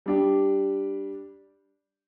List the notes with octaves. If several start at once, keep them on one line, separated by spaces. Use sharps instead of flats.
G3 D4 G4